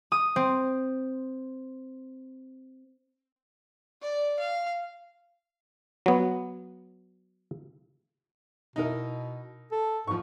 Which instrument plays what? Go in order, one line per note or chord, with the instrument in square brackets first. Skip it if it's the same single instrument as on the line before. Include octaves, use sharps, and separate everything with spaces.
[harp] D#6
C4
[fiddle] D5
F5
[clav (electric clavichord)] F#3 B3
[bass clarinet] B2 [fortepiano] D#4 E4 A#4
[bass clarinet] A4
[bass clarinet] G#2 [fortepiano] F3 C#6